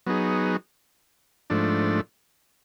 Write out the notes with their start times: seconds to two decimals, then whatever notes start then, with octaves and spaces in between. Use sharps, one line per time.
0.06 F#3 B3 D#4 G#4
1.50 G#2 F3 A3 D4